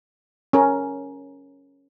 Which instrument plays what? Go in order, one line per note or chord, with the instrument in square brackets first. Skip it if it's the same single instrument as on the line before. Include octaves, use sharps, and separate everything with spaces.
[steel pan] C#4 A#4